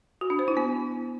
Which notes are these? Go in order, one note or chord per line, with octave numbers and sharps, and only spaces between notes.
F#4
D4
C5
E4
B3